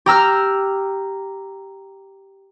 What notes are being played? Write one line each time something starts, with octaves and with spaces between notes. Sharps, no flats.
G4 A#5 E6 F6